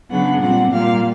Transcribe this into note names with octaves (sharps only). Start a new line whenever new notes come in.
C#3 F#3 B3 D4 F#5
A#2 G3 C4 F#5
A#2 G3 A#3 F5